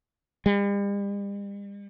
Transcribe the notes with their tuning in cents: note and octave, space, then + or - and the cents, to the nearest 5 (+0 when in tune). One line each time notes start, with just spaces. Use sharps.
G3 +45